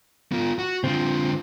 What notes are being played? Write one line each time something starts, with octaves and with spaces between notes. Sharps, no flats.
B3 F4
F#4
D3 C4 F4